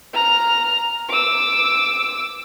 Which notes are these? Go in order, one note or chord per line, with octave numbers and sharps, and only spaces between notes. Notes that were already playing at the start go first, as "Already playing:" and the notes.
A#5 F6
D6 E6